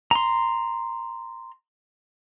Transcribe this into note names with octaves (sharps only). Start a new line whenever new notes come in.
A#5 C6